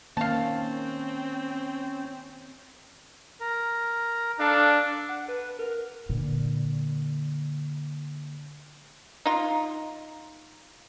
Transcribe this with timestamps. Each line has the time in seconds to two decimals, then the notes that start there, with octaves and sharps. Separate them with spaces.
0.17 D#3 A#3 C4 C#4 F5 A5
3.41 A#4
4.40 D4 A4 F5
5.09 F#5
5.28 B4
5.59 A#4
6.09 A#2 D3
9.25 D#4 F4